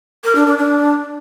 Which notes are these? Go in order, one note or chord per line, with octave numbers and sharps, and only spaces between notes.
A#4
D4
D4
D4